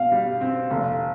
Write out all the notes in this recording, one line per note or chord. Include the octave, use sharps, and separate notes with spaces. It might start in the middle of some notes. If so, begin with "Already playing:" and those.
Already playing: B2 F5
G3
C4
F1